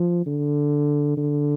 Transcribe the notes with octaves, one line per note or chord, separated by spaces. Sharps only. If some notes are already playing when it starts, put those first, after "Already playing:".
Already playing: F3
D3
D3